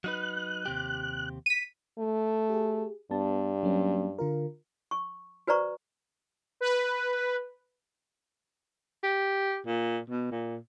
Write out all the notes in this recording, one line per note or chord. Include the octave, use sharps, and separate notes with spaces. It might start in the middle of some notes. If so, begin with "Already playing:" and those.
F#3 D#4 B4 F#6
D#2 C3 G4
B6 D#7
A3
G4 G#4
G2 B3 A5
F#3 A#3 C#4
D3 F4 A#4
C#6
F#4 B4 C5 D5 A#5 C#6
B4
G4
A#2
B2
A#2